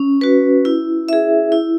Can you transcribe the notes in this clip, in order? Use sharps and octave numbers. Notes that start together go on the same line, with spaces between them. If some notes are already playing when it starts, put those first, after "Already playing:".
Already playing: C#4
F#4 B4
E4
G#4 E5
E4